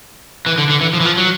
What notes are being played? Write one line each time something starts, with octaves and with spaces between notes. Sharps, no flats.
E3
D3
D3
E3
F3
E3
F3
F#3